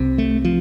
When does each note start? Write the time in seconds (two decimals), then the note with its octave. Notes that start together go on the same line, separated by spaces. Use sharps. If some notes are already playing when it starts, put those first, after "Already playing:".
Already playing: C2 C3
0.18 A3
0.45 F3